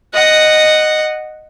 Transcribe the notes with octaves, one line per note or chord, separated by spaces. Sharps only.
D#5 F#5